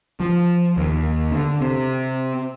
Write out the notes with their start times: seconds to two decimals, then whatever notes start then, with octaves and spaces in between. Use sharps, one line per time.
0.20 F3
0.77 D#2
1.31 D3
1.61 C3